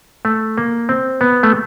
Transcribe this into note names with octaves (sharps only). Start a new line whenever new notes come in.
A3
A#3
C4
B3
A3